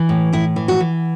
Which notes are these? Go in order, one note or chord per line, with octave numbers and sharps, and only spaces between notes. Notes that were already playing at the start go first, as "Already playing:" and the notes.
Already playing: E3
A2
A2 E4
E3
F#4
E3